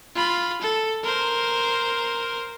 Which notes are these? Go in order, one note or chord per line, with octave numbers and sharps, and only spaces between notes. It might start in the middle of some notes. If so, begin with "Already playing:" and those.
F4 B5
A4
A#4 C5